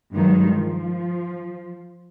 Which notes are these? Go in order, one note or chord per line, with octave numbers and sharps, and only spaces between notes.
G2 D#3 F#3 G#3
F3